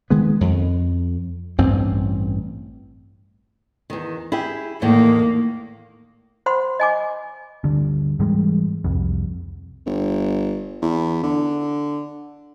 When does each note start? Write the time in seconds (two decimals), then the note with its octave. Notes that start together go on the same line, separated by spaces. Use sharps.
0.10 D#3 G#3 B3
0.41 F2
1.58 A1 G2 C4
3.90 E2 D#3
4.32 E4 G4 G#4
4.82 E2 A2 D#3 A#3
6.46 C5 F#5 B5 C6
6.80 D#5 G#5 D6
7.64 D2 G2 D3
8.19 G#2 E3 G3 G#3
8.84 C2 F2
9.86 G1
10.82 E2
11.23 D3